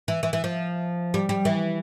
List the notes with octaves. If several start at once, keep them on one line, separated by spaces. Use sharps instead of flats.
E3
E3
E3
F3
G3
G3
E3